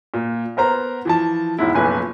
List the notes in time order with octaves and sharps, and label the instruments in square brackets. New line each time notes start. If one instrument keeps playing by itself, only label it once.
[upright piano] A#2
B3 A#4 C5 A#5
E3 F3 A5
E1 G#2 E4
F#1 B1 F3 B4 G#5